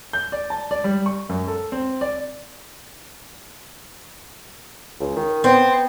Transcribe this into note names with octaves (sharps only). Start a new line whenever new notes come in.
G6
D5
A5
D5
G3
C#6
F#2
A4
C4
D5
C#2
D#3
B3 C4